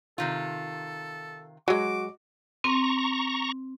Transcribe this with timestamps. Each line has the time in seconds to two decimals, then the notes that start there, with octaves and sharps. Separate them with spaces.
0.18 C3 D#3 F4 A4
1.68 F#3 G#3 F#4 D6
2.64 C4 A#5 C#6